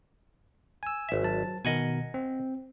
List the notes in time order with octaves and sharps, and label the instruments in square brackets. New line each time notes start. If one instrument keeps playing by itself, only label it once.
[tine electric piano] G#5 E6
[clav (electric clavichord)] G#1 E5
[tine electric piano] F#3 A5
[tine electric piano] B2 D#3 A#4 [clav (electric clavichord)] D#5 F#5 G#5
[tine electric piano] C4